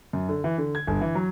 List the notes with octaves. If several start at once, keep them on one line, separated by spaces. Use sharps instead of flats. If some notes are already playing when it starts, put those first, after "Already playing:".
F#2
D3
E3
D3
G#6
G1
E3
F#3